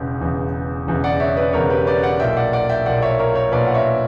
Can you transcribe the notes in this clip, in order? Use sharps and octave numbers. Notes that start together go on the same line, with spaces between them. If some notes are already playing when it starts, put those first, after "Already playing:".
Already playing: E1 E2 C#3
E1 E2 C#3
E1 E2 C#3
D5 F#5
C#5 E5
B4 D5
E1 E2 C#3 A#4 C#5
G4 B4
B4 D5
D5 F#5
B1 A#2 A#3 E5 G5
D5 F#5
D5 F#5
E5 G5
B1 A#2 A#3 D5 F#5
C#5 E5
A#4 C#5
A#4 C#5
B1 A#2 A#3 B4 D5
F#5
C#5 E5